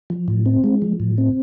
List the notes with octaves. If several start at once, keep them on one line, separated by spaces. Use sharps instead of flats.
F3
A2
C4
G#3
F3
A2
C4